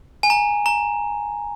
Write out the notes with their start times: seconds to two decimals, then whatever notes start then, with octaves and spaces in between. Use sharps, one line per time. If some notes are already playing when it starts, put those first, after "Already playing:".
0.23 G#5
0.30 A#5
0.66 A#5